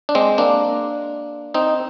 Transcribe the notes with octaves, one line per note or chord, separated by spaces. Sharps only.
D4
G#3 C4
A#3 D4
C4 D#4